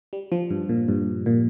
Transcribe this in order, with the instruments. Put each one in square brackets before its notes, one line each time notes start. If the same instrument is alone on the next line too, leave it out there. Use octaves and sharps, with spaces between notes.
[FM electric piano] G3
F3
G2
A#2
G2
A#2